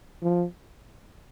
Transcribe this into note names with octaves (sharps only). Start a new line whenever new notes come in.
F3